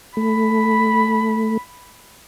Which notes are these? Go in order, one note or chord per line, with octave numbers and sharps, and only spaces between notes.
A3 B5